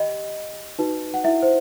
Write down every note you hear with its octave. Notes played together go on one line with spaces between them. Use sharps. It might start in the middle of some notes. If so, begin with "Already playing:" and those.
Already playing: G4 D#5 G5 B5
D#4 F#4 B4
F#5
E4 E5
C5